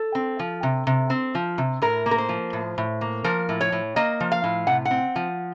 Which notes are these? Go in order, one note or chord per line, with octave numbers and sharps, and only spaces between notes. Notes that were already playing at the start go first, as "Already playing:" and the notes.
Already playing: A4
C4
F3
C3
C3
C4
F3
C3
A2 A#4
A#3
A#4
C5
F3
A2
A2
A#3
F3 A#4
A2
C#5
A2
A#3 D#5
F3
F5
A2
C3 F#5
F#5
C4
F3